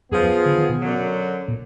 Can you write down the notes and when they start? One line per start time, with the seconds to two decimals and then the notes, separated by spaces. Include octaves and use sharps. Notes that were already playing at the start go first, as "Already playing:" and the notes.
0.12 F#2 F3 B3 F4 G#4
0.20 F2
0.46 D3
0.58 D#3
0.69 B2
0.80 F#2 D3 F#3
1.48 A#2